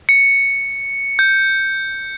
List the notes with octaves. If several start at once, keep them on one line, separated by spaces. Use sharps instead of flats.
C#7
G6